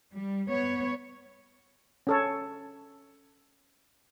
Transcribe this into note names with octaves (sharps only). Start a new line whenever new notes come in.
G3
B3 C#5
C#4 A4 C#5